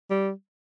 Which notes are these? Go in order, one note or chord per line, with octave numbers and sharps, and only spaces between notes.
G3